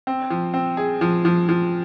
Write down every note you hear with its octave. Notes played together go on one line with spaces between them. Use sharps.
C4
F3
C4
G#4
F3
F3
F3